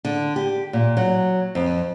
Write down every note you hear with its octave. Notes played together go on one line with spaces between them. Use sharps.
D3
G4
A#2
F#3
F2